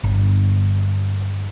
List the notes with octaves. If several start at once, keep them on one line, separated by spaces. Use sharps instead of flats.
G1